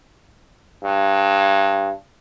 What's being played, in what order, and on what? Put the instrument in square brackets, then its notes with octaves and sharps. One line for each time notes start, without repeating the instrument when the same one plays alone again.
[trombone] G2